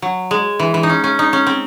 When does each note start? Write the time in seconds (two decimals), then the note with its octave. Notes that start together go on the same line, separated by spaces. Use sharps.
0.02 F#3
0.31 G#3
0.59 E3
0.74 E3
0.83 D#4
0.89 C#4
1.04 C#4
1.19 D#4
1.33 C#4
1.47 C4